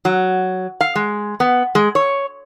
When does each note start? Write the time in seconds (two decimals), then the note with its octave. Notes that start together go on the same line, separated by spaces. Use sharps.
0.05 F#3
0.81 F5
0.95 G#3
1.40 B3
1.75 G#3
1.95 C#5